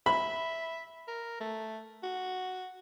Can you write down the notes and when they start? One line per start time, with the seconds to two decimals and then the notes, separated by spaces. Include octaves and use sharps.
0.06 E5 B5
1.08 A#4
1.40 A3
2.03 F#4